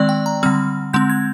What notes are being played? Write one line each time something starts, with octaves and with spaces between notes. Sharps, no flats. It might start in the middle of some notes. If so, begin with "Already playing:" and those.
Already playing: D#3 G#3 C4 D5
G5
A#5
D3 G3 C4 F6
D3 G#3 C4 G6
G#6